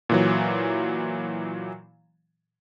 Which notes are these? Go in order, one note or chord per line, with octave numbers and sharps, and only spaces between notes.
A#2 E3 F#3